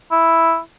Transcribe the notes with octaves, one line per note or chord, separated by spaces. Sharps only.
E4